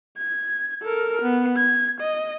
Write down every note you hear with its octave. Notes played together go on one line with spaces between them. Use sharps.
G#6
A4 A#4
B3
G#6
D#5